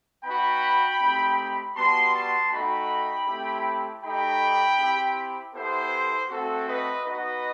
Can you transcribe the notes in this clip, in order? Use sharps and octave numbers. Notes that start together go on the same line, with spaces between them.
B3 D#4 F#4 G5 B5
A3 C4 D#4 G4
G3 B3 F#4 A5 C6
A5 C6
A3 D#4 F#4 G5 B5
A3 C4 E4 G4
A3 D#4 G4 G5 B5
C4 E4 G4
B3 E4 G4 A4 C5
A3 C4 F#4 A4
B4 D#5
B3 D#4 F#4 B4 D#5